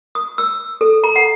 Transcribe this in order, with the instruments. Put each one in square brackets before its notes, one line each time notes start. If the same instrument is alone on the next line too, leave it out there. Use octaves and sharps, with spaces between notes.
[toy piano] D#6
E6
A4
A#5
F#5